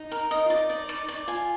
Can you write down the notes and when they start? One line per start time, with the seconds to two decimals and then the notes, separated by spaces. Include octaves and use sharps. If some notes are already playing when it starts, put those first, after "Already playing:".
Already playing: D#4
0.12 A#4
0.31 D#5
0.46 F4
0.50 D#4 D5
0.70 D5
0.89 D5
1.08 D5
1.28 F4 G#5